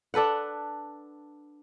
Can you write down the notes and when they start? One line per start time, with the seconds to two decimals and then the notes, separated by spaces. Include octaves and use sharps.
0.14 D4 A4 B4 F#5